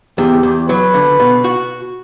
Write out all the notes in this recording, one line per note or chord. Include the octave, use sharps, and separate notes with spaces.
E2 G4
E2
F#3 B4
D3
B2
F#4